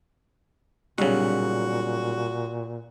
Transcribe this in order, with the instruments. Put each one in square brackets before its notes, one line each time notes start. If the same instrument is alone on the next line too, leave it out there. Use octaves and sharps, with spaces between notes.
[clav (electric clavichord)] B1 C#3 [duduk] A#2 [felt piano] G3 [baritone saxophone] F#4